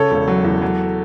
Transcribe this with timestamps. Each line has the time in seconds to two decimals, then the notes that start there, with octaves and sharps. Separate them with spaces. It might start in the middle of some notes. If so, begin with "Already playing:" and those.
Already playing: C#3 A4 C#5
0.11 E1
0.28 F#3
0.44 E2
0.61 F#3